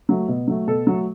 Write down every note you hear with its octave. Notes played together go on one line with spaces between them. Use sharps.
F#3 A3
B2
F#3 A3
B2 A4
F#3 A3